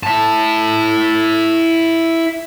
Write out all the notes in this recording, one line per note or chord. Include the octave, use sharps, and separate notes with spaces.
E4 A5